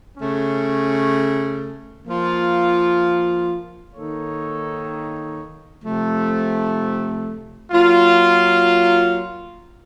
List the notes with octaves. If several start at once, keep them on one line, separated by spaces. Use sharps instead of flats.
C#3 A3 C#4
F3 A#3 F4
D#3 A#3 D#4 A4 C#5
C3 F3 A3
F#3 A#3 F4